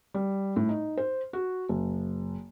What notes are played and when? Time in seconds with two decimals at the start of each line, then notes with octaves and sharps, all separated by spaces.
0.14 G3
0.56 A2
0.69 D#4
0.97 C5
1.33 F#4
1.69 F#1